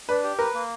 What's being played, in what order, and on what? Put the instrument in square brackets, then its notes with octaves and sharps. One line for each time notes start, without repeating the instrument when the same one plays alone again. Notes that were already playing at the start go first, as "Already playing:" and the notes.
[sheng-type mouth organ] D4 [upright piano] B4
[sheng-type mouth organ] G4
[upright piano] A#4 [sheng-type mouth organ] B4
[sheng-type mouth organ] A#3